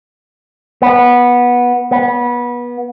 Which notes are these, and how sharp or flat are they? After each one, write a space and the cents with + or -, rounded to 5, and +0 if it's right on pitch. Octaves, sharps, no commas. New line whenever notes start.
B3 -15
B3 -25